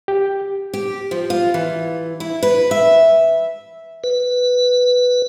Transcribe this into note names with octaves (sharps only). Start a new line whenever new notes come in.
G4
G4
F3
F4
E3
E4
B4
E5
B4